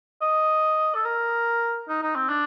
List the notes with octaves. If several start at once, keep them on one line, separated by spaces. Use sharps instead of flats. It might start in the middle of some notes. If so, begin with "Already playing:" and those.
D#5
A4
A#4
D#4
D#4
C4
D4